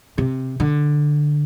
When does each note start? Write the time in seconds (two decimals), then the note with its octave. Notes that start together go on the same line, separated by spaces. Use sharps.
0.18 C3
0.60 D3